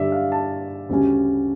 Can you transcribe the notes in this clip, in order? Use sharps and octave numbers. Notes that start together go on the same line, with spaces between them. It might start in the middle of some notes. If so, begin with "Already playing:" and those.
Already playing: G2 D3 G3 D5 E5
F5
A5
D2 C#3 G3 C#4